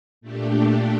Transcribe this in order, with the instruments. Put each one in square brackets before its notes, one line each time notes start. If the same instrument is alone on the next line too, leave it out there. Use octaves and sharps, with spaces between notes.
[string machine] A#2 A3 D4 G4